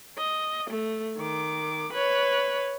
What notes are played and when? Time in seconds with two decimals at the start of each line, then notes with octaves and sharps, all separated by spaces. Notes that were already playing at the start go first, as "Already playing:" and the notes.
0.17 D#5
0.70 A3
1.17 D#3 D6
1.92 B4 C#5